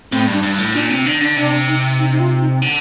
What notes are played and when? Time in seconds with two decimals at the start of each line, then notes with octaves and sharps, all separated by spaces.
0.12 A2 C4
0.27 G2
0.33 D4
0.43 G2
0.59 A2
0.74 A#2 D4
0.90 C3 C4
1.05 D#3 D4
1.21 D3 D4
1.36 C3 D4
1.68 D#4
1.99 D#4
2.12 D#4
2.20 F4
2.41 D#4
2.62 D3